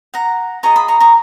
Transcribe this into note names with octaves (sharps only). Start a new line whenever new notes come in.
F#5 A#5
F4 G#4 D#5 A#5 C#6
B5 D#6
A#5 C#6
A#5 C#6